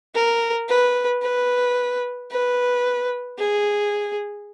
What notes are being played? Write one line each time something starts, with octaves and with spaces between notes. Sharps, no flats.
A#4
B4
B4
B4
G#4